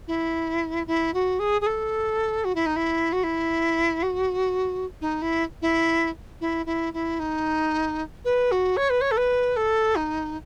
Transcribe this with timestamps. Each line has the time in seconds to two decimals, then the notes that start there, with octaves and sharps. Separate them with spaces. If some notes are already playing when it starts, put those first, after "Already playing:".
0.07 E4
0.87 E4
1.14 F#4
1.39 G#4
1.61 G#4
1.66 A4
2.44 F#4
2.55 E4
2.66 D#4
2.76 E4
3.12 F#4
3.23 E4
4.03 F#4
5.01 D#4
5.22 E4
5.62 E4
6.41 E4
6.66 E4
6.93 E4
7.20 D#4
8.25 B4
8.51 F#4
8.77 C#5
8.90 B4
9.01 C#5
9.11 A4
9.17 B4
9.56 A4
9.96 D#4